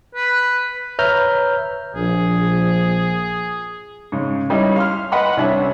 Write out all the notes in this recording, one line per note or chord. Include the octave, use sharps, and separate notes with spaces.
B4
B4 C#5 E5 A#5 F6 G6
A#1 G#4
G#2 C#3
G3 C#4 D#4 E4
F5 C6 F6
B4 D#5 F#5 B5 C6
C2 C#4 D4 E5